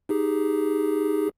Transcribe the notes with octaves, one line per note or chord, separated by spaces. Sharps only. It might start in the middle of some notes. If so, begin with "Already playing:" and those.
D#4 G4 G#4